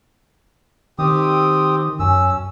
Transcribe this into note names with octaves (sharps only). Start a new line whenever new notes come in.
D#3 C4 G4 D#6
F#2 C#4 E6